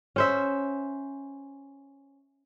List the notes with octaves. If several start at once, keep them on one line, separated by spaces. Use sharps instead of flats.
C#4 C5 E5